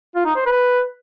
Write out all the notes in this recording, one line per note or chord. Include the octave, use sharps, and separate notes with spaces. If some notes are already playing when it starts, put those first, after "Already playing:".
F4
D#4
C5
B4